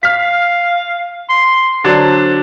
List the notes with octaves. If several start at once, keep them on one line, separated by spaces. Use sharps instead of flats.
F5 F6 B6
C6
D3 F#3 D4 C5